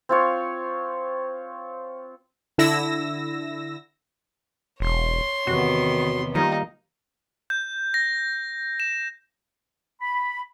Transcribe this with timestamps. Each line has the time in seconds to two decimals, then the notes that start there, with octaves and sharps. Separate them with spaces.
0.09 C4 F4 C#5
2.58 D3 E4 E6 A#6
4.80 E1 C#5 C6
5.47 E2 C3 D#3 B3 F#4
6.35 D#3 G3 A#3 D#4 F4
7.50 G6
7.94 A#6
8.80 E7
10.01 B5